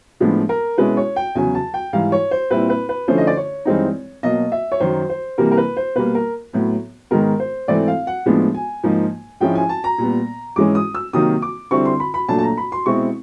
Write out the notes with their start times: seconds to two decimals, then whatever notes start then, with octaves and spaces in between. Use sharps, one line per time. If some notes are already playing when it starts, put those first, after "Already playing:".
0.20 A2 F3 G#3 B3 D4
0.49 A#4
0.78 B2 G#3 C#4 E4 B4
0.97 C#5
1.16 G5
1.35 E2 C#3 F#3 G#5
1.55 A5
1.74 G5
1.93 G#2 E3 G3 F5
2.12 C#5
2.31 C5
2.51 A#2 G3 C4 E4 B4
2.70 B4
2.89 B4
3.08 D3 F3 A3 C#4 E4 C5
3.18 D#5
3.27 D5
3.37 C#5
3.65 G2 E3 G#3 C4 D#4
4.23 B2 F#3 A#3 D#5
4.52 E5
4.72 C#5
4.80 F#2 D#3 F#3 C5
5.10 C5
5.38 C3 E3 G3 A#3 A#4
5.51 A#4
5.57 B4
5.77 C5
5.95 B2 G3 A#3 B4
6.15 A#4
6.53 A2 F#3 B3
7.11 G#2 D#3 G#3 B3 A#4
7.40 C5
7.68 G#2 E3 A3 C4 D5
7.88 F5
8.07 F#5
8.26 A2 F3 G#3 B3 D4
8.54 G#5
8.84 G#2 F3 A#3 D#4
9.41 G#2 F3 G#3 C#4 E4 G5
9.55 G#5
9.69 A5
9.84 A#5
9.98 A#2 G3 B3
10.56 G#2 E3 G#3 C#4 D6
10.75 D#6
10.95 E6
11.13 C3 D#3 F#3 A#3 D#4 D#6
11.42 D6
11.71 D3 G3 C4 E4 C#6
11.85 C6
12.00 B5
12.14 B5
12.28 A#2 F#3 A3 D4 A5
12.38 A5
12.43 A#5
12.57 B5
12.72 C6
12.86 B2 G#3 C4 E4 C#6